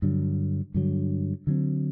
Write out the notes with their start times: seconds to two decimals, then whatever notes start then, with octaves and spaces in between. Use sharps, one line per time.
0.02 G2 D3 F#3
0.74 G2 D3 F#3
1.47 D3 F#3 C4